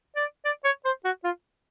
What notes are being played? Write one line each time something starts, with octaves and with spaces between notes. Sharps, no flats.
D5
D5
C#5
C5
F#4
F4